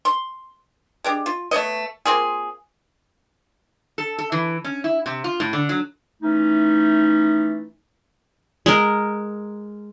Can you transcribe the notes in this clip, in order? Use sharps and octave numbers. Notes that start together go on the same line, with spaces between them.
C6
G#3 D4 G4
F4
A3 B3 C#5 D#5
A#3 C4 F4 G#4
A4
A4
E3
C#4
E4
C3
F4
A2
D3
F#3
E3 A3 C#4 D#4
G#3 A#4